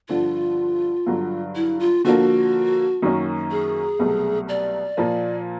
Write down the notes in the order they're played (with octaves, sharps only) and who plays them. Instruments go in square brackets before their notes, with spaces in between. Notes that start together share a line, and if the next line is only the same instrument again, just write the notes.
[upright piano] G2 D3 F3 [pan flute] F4
[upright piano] G2 D3 F#3
[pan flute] E4
F4
[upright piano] D3 F3 A#3 [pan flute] F#4
[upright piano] F#2 D#3 F#3 A#3 C#4
[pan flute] G#4
[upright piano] C2 B2 F#3 A3
[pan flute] D5
[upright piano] A#2 F3 A#3